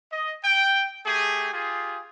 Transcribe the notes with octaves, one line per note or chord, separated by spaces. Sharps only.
D#5
G5
A3 G4 G#4
F4 G4 G#4